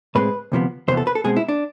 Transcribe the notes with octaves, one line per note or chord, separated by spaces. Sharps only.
A2 G#3 C4 B4
D2 C3 F3 B3
E2 C3 E3 B3 C5
A4
B4
A4
B2 G#3 C4 G#4
E4
D4